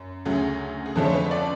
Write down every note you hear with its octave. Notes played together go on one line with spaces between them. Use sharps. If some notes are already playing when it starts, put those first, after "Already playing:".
Already playing: F#2
D2 C#3 F#3 A3 C#4 G#4
G#4
F2 D3 F3 A3 C#4 A4
C#5
B4
D5